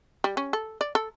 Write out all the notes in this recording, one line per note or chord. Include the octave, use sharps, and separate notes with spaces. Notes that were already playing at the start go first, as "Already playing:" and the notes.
G3
C#4
A4
D5
A4